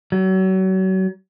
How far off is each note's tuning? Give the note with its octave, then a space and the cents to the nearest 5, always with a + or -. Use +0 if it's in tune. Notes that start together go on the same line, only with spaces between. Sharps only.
F#3 +35